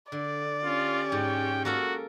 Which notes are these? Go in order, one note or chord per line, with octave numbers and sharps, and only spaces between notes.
D3 D5
C#4 F4 G4
G#2 G5
A#3 F#4 A4 A#4